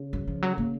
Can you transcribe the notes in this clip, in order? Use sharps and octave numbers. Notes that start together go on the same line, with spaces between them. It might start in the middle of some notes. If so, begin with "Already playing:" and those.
Already playing: C#3
F#3
F3
F#3
A#3